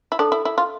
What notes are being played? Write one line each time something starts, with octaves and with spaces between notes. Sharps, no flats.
E4
D4 A4
E4
E4
F4